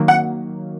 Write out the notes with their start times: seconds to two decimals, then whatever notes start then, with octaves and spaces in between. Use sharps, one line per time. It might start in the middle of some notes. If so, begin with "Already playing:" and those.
Already playing: D#3 F#3 A#3
0.08 F#5